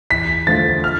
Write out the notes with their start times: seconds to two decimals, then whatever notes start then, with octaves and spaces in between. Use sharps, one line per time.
0.11 E2 B6
0.47 D3 F3 A3 A6
0.84 F6